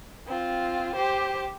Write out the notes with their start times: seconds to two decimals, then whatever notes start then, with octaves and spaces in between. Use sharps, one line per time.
0.27 C4 F4
0.96 G4 C5